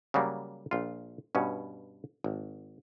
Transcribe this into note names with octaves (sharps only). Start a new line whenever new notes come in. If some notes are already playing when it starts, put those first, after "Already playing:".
C#3 F#3 G3 A#3
A#1 F4
G2 B2 C#4
G#1